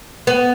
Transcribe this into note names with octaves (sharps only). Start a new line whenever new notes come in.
B3